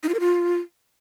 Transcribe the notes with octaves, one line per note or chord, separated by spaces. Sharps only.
D#4
F4
A#4
F4